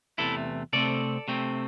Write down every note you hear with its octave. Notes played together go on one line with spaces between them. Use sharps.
E2 C3 E3 A3 E4 A4
C3 A3 C4 A4 D5
C3 A3 C4